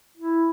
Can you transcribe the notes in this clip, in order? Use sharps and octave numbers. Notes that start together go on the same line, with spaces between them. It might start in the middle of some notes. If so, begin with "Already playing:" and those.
E4